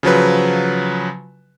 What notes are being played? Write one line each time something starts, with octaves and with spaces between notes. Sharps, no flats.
C#3 F3 F#3 B4